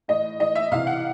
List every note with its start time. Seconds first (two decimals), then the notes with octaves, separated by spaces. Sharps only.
0.08 A2 E3 D#5
0.39 A2 E3 D#5
0.55 E5
0.71 C3 E3 F5
0.87 F#5